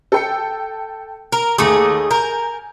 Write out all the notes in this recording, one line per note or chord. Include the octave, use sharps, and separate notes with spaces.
A4 G5 C#7
A#4
D#2 A3 D#4 G#4 D6
A#4 G#5 G6